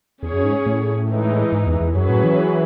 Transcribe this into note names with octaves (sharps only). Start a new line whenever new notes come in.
E2 C#4 G#4 C#5
F#2
G#2
A2
E3 G#3 D#4
G#2
E2
E2
F#2 F#3 C#4 G#4 B4
A2
E3